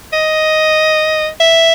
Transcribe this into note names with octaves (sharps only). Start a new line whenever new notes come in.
D#5
E5